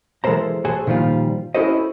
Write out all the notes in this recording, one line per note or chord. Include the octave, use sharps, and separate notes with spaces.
E3 G#3 A4 A#4 C5 A#5
F#4 G#4 A4 C5 G#5
A#2 D#3 F3 G3 F4
C#4 E4 F#4 A4 C5 D#5